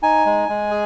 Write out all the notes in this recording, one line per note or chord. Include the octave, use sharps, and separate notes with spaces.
D#4 G#5
G#3
G#3
G#4